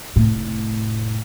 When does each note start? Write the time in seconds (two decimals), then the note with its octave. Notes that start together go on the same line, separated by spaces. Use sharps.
0.16 F1 A2